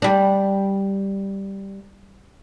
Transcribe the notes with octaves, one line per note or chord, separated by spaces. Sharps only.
G3 D4